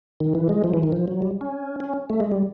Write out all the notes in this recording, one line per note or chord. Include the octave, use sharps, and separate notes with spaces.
D#3
E3
G#3
F3
E3
D#3
F3
F#3
G3
C#4
C#4
A3
G#3
G3